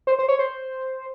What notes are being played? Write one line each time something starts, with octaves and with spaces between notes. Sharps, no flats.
C5
C5
C#5
C5